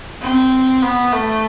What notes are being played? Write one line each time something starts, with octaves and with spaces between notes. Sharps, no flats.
C4
B3
A3